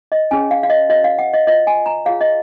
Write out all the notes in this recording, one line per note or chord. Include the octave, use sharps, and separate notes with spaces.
D#5
C#4 G#4 C#5 G#5
F5
F5
D#5
F#4 B4 D#5
F5
F#5
D#5
F4 B4 D#5
G#5
A#5
F4 G#4 C#5 F5
D#5